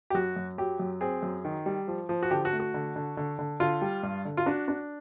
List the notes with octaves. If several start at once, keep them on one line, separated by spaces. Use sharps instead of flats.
G4
F#2 F#4
F#2
F#3 G4
F#2
C4 G#4
F#2
D#3
G3
F3
F3
F#4
D3 G4
F#4
A3
F#4
D3
D3
D3
D3
D3 F4
G3
G2
D3
F4
D4 F#4
D4